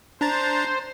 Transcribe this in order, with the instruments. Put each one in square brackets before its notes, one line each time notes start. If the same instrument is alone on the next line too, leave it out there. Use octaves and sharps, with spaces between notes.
[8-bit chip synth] D4 A#5 A6 [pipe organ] C5